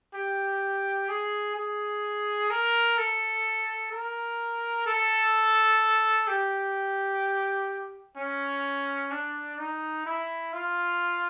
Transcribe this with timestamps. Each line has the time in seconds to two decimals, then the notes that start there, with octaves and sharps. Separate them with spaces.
0.14 G4
1.09 G#4
1.56 G#4
2.50 A#4
2.98 A4
3.92 A#4
4.86 A4
6.28 G4
8.17 C#4
9.11 D4
9.58 D#4
10.06 E4
10.53 F4